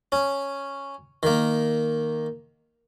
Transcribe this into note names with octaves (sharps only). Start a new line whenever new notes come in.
C#4
D#3 A#3